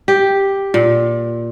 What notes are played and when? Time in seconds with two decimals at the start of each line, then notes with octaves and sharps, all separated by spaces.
0.08 G4
0.74 A#2